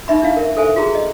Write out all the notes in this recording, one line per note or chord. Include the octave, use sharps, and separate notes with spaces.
D#4 E5 B5
D4 E4 F5
A#4 E5
A4 C5 E5 G#5
F4 F#4 G#4 A#5
D#5